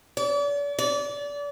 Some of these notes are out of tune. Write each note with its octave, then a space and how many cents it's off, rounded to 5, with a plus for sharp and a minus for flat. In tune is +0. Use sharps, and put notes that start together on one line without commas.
D5 -40
D5 -30